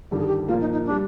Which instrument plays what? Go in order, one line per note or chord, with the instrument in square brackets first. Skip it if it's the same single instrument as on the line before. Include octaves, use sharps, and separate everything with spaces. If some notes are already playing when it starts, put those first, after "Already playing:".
[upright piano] G1 G2 D#3 G3 [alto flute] G4
[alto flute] G#4
G4
[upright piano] A#2 F3 A#3 [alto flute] F4
[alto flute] D#4
D#4
[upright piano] G3 [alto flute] D4